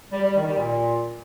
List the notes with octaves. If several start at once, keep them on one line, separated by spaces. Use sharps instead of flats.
G3
G3
D#3
G3
A#2